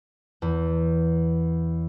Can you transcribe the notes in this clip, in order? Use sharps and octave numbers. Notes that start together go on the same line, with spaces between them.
E2